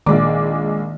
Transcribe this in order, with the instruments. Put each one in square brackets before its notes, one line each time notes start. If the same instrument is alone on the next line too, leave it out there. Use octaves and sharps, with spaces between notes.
[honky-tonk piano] A#1 G#3 D6 [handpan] D#3 A#3 D5